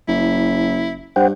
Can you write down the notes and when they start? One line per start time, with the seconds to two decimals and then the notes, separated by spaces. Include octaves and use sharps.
0.08 F#1 E4
1.16 G2 C5 F#5 G5